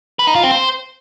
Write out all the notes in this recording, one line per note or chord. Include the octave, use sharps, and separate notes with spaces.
B4
D#4
F4
C4
C5